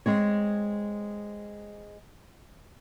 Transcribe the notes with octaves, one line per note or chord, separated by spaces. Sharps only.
G#3 C4 C#5